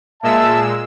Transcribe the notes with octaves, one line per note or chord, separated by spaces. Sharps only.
A#2 G#3 E5 A5 E6